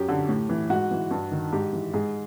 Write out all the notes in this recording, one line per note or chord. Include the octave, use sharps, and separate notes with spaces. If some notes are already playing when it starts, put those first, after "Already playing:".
Already playing: F#2 G4
D3
A2
E3
G#2 F#4
E3
G2
D#3
G#2 G4
E3
G#2 G#4